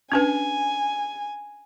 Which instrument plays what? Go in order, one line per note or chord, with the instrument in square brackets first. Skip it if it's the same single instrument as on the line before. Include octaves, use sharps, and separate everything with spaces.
[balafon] C#4 D4 B4 [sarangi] G#5